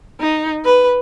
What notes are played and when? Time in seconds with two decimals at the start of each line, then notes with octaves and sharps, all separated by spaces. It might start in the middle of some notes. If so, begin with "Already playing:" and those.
0.20 D#4
0.65 B4